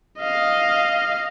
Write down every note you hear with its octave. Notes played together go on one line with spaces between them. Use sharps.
D#5 F5